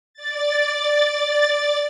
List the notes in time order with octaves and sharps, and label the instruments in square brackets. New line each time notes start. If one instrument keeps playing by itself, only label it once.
[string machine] D5 A6